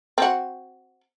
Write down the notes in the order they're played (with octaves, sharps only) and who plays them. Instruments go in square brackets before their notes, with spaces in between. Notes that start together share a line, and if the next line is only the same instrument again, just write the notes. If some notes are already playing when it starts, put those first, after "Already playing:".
[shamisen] C4 F#4